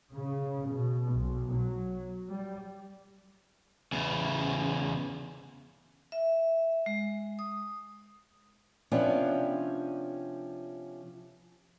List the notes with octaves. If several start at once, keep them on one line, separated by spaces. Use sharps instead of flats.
C#3
B2
B1
F#3
G3
E2 C#3
E5
G#3
D#6
C3 F3 B3 C#4 D4